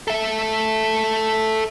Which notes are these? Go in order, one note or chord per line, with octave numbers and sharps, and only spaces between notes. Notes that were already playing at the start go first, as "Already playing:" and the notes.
A4 E5